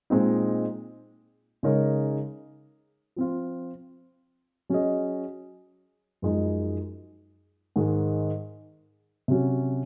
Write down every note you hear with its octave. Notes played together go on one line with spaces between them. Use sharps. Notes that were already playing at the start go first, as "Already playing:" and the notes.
A#2 G#3 C4 D#4
C#3 G#3 D#4 A#4 C#5
F3 C4 F4
F#3 C#4 G#4 D#5
F#2 F3 G#3 D#4
G#2 D#3 G#3
C3 F#3 C#4 F#4